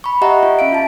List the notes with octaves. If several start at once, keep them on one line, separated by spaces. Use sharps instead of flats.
B5 C#6
G4 D#5 E5 F#5 A#5 C#6
F4
C#4 E5 F5 D7
F4 A5